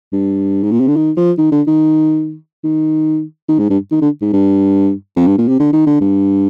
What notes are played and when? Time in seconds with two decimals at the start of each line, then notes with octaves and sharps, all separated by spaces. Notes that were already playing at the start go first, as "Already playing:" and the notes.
0.13 G2
0.63 G#2
0.71 A#2
0.80 C3
0.88 D3
0.96 D#3
1.17 F3
1.38 D#3
1.52 D3
1.67 D#3
2.64 D#3
3.48 D#3
3.59 G#2
3.70 G2
3.91 D#3
4.01 D3
4.21 G#2
4.33 G2
5.16 F2
5.27 G2
5.38 A#2
5.48 C3
5.59 D3
5.73 D#3
5.87 D3
6.01 G2